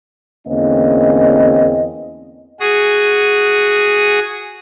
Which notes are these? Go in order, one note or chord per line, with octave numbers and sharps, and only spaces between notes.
E2 D3 A#3 C4 C#4 D#5
F#4 G#4 D#6